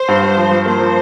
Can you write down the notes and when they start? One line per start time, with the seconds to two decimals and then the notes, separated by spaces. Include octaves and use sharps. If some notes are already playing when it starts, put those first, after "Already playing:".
Already playing: C5
0.08 G2
0.23 G2
0.37 F3
0.51 F3
0.66 A#3 C5
0.80 F3